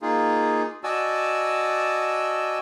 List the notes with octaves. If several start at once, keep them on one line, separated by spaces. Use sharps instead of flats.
A#3 D#4 F4 G#4
F#4 D5 D#5 G#5 A5 E6